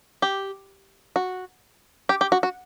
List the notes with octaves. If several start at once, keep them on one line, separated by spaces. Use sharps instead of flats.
G4
F#4
G4
G4
F#4
F#4